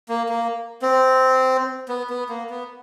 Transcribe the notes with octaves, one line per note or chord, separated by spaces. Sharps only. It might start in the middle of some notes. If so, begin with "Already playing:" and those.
A#3
A#3
C4
B3
B3
A#3
B3